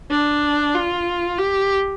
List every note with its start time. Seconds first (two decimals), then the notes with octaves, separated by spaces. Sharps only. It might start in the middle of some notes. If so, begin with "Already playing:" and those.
0.11 D4
0.75 F4
1.38 G4